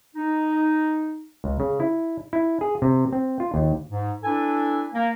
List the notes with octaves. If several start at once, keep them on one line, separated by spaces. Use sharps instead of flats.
D#4
C#2
C#3
E4
E4
G#4
C3
C4
F4
D#2
G#2
D4 E4 A4 B4 G#5
A#3